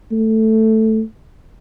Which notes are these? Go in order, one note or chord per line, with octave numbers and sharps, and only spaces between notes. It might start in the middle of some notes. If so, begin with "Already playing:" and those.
A3